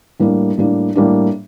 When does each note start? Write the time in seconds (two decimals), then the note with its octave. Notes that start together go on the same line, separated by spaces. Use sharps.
0.20 A2 G3 A#3 D4
0.58 A2 G3 A#3 D4
0.96 A2 G3 A#3 D4